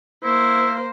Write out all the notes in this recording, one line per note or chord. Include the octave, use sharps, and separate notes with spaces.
A#3 E4 C5